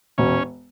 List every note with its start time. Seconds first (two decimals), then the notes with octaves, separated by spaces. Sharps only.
0.18 E1 C#4